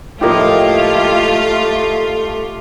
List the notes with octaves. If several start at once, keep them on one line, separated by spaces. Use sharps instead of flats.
A2 F3 A3 A#3 F4 G4 D#5